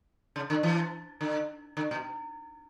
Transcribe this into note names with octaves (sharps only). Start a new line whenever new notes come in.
C#3
D3
E3
D3
D3
B2